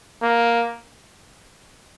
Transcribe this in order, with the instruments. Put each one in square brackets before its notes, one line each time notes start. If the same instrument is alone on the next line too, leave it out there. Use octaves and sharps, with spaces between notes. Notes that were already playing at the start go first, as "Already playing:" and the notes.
[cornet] A#3